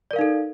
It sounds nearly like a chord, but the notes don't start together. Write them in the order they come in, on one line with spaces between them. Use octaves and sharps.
D5 A#4 F5 D#4 A4